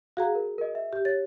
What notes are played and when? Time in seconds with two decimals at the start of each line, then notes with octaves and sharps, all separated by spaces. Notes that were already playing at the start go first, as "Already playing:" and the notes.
0.17 F#4 G#4 F5 F#5 A#5
0.35 A#4
0.58 A#4 D#5
0.75 E5
0.93 G4
1.05 C#5 A6